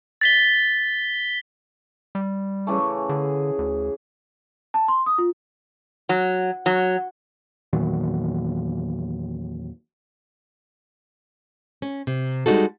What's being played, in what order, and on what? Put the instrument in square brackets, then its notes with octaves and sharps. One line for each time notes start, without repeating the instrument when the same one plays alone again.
[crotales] A6 B6 G7
[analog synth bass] G3
[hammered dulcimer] C#3 E3 A3
[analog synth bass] D3 [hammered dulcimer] G#4
[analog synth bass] D2
[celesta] A5
C6
D#6
F4
[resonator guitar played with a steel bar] F#3
F#3
[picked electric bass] E2 A#2 D#3 F#3
[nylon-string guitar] C#4
C3
G3 G#3 D4 D#4 F#4 A4